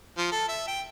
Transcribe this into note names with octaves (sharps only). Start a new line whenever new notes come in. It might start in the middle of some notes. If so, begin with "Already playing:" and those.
F3
A4
E5
G5